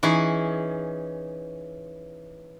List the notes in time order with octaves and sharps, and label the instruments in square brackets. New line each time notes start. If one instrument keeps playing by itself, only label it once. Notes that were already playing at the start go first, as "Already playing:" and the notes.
[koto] E3 C#4 D#4 G#4